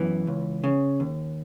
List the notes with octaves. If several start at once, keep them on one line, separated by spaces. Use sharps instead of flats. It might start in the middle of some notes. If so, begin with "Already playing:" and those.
Already playing: F#2 E3 B3
C#2
C#3
D#2